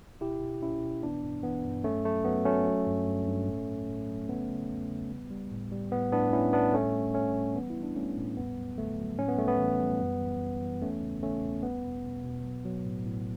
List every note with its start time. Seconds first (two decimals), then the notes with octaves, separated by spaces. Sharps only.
0.21 B2 E4 G4
0.41 B2
0.61 B2 C#4 E4
0.83 B2
1.02 E3 B3 D4
1.23 G2
1.43 E3 B3
1.64 G2
1.84 F#3 A3 C#4
2.05 F#3 A3
2.25 F#3 B3
2.45 F#3 A3 C#4
2.66 F#3
2.87 G2
3.07 G2
3.27 G2
3.48 A2
3.68 F#3
3.88 A2
4.09 F#3
4.29 C#3 B3
4.50 C#3
4.70 E2
4.90 C#3
5.11 G3
5.31 G3
5.51 A2
5.72 G3
5.92 A2 B3
6.12 A2 B3 D4
6.33 A2 C#4 E4
6.53 A2 B3 D4
6.74 G3 A3 C#4
6.94 A2
7.14 G3 A3 C#4
7.35 G3
7.55 E3 B3
7.70 E4
7.75 G3
7.83 D4
7.96 G3 A3 C#4
8.16 A2
8.37 E2 B3
8.57 F#3
8.78 D3 A3
8.97 F#3
9.18 A2 C#4
9.28 B3
9.38 G3 A3
9.48 B3
9.59 E3
9.80 G3
10.00 F#2
10.20 E3
10.41 F#2
10.62 E3
10.81 E2 A3 C#4
11.02 C#3
11.22 C#3 A3 C#4
11.43 E2
11.63 G3 B3
11.84 B2
12.04 B2
12.24 B2
12.44 F#3
12.65 F#3
12.85 A2
13.05 A2